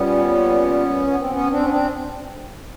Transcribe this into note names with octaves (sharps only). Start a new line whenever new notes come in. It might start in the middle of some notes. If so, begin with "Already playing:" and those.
Already playing: A#2 G3 B3 C#4
B3
C4
B3 C#4
C4 D4
C#4
C4 D4